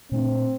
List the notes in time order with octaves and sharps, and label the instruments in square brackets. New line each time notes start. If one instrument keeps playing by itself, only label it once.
[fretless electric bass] A#2 A3 D4 [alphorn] C4